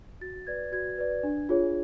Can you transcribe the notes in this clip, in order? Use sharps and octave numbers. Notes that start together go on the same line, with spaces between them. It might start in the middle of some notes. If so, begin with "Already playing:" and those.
F#4 A6
B4 D5 G#6
F#4 G#6
B4 D5
D4
F4 G#4 C#5